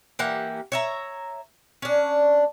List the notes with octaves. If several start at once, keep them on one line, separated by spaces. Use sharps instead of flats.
E3 A#3 G4 F#5
C#5 E5 A#5
C#4 D4